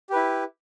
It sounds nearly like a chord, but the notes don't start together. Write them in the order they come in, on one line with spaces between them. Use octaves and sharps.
G4 B4 E4